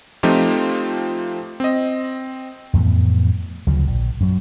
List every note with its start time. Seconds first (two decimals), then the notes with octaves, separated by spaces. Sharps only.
0.23 F3 A3 C4 D#4 F4 G4
1.60 C4 D#5
2.73 F2 A2 E3 B3
3.67 D2 C#3 F3 F#3
3.87 A#1
4.20 F#2 F#3